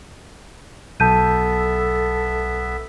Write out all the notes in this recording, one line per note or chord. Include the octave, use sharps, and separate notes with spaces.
B1 B3 A4 E5 A5 G6 D#7